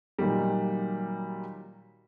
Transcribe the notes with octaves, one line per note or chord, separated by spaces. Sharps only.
A#2 D#3 F#3 G3